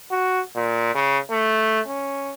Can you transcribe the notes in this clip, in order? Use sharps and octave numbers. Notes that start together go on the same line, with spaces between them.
F#4
A#2
C#3
A3
C#4